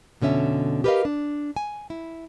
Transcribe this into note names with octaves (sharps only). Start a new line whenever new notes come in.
F2 B2 D3 C#4 E5
G4 A#4 B4 C#5 D#5 F5
D4
G#5
E4